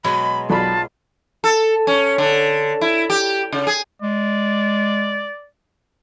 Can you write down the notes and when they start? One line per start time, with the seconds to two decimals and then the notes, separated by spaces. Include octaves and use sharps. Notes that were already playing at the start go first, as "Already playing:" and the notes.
0.04 B2 F#3 G#3 B5
0.50 B1 F4 D5 A5 B5
1.44 A4
1.87 C#4
2.18 D3
2.81 E4
3.10 G4
3.52 C#3
3.67 G#4
4.02 G#3 D5